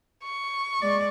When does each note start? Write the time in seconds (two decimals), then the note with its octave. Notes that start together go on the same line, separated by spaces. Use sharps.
0.23 C#6
0.80 G#3 D5